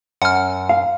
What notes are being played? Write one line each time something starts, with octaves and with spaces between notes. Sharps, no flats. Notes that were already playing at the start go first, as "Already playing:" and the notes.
F#2 F#5 F6
F5